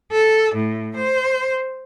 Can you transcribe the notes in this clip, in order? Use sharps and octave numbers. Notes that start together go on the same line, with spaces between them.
A4
A2
C5